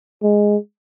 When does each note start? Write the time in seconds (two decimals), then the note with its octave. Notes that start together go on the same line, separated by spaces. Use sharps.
0.22 G#3